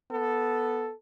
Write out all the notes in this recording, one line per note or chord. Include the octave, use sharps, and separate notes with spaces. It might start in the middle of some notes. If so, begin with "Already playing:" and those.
B3 A4